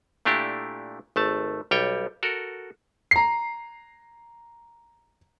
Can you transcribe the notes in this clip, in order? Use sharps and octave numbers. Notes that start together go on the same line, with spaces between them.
A#2 A3 D4 E4 G4
G#1 A3 A5
B1 G3 C#5 G5
F#4 A4 A#4
A#5 C7